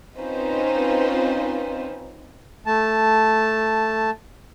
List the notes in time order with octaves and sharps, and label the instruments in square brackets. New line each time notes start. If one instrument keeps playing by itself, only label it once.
[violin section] C4 C#4 D#4 F4 B4 C5
[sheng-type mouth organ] A3 A5